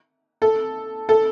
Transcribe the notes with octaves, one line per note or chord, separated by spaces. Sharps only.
A4
A4